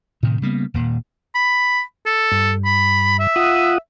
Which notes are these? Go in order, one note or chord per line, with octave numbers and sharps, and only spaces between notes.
A2 C3 D#3
C#3 G3 A#3 B3
D#1 A#2
B5
A4
G2
B5
E5
F4 F#5 D#6